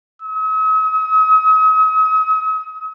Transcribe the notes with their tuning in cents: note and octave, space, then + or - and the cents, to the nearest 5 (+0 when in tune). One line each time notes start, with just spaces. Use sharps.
D#6 +45